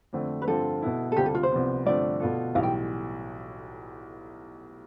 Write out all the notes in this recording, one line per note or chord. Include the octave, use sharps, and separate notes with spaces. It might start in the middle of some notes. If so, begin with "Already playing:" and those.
F2 D3 A3 C4
B4
G2 D3 F3 C4 F4 A4
B2 B3 E4
A4
D2 C3 G3 C4 F4 G4
A4
F4
C5
C2 C3 F3 B3
G2 D3 F3 A3 C4 D5
B2 B3 F4 A4
B1 A2 E3 G3 F5
G5